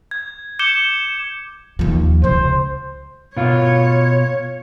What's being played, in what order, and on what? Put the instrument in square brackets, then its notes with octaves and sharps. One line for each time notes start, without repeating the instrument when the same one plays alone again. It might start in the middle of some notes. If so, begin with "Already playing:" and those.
[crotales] G#6
D6 G6 C#7 E7 G7
[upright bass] D#2 F3
[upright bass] C#2 C#3 [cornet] C5
[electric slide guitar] B2 F4 [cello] C#5